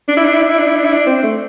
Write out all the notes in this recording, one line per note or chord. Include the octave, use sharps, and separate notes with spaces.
D4
E4
D4
E4
D4
E4
D4
E4
D4
E4
D4
C4
A3